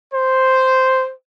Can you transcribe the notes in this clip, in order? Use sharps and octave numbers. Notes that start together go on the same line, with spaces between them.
C5